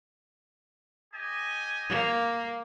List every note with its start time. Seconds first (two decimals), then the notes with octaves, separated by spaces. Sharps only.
1.12 G4 D#5 G#5
1.89 A#3